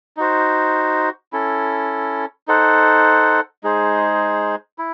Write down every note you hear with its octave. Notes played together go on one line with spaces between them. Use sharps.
D#4 F#4 C5
C#4 E4 A4
D#4 A4 C5 F#5
G#3 D#4 G#4 C5
E4